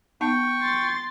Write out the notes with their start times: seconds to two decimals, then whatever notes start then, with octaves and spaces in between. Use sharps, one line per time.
0.21 B3 D#4 G5 A5 C#6
0.61 C6 A6